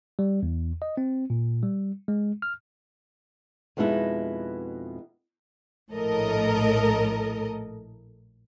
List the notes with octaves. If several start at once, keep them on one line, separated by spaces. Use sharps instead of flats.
G3
E2
D#5
C4
A#2
G3
G#3
F6
F2 B2 G#3 B3 D#4 E4
A#1 A2 A4 A#4 D#5